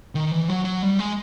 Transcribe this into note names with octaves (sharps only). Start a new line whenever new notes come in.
D#3
E3
F#3
F#3
G3
G#3